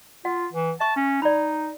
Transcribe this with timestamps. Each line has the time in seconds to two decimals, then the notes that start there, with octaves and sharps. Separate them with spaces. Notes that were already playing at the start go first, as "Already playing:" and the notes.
0.25 F4 F#5
0.53 E3
0.80 E5 A5 C#6
0.96 C#4
1.22 D#4 D5 B5